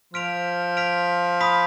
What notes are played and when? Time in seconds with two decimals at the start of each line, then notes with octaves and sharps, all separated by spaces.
0.14 F3 F6 B6 D7 F7
0.77 F6 B6 D7 F7
1.40 B5 D#6 B6